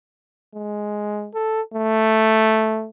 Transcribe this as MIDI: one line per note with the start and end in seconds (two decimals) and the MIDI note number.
0.54 1.29 56
1.34 1.61 69
1.74 2.88 57